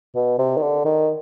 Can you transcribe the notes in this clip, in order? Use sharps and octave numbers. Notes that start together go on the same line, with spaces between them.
B2
C3
D#3
D3
D#3